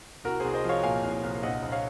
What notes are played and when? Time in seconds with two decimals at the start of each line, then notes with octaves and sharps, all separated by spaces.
0.24 C2 F#4 A#4
0.40 C2 G#4 C5
0.54 C5 D#5
0.64 F3
0.69 C#5 F5
0.83 A#2 F5 G#5
1.03 C2
1.23 C2
1.43 A#1 D#5 F#5
1.63 A#1
1.72 C#5 F5